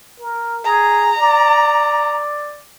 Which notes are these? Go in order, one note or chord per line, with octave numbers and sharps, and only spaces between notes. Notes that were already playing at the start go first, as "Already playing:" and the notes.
A#4
G#4 A#5
D5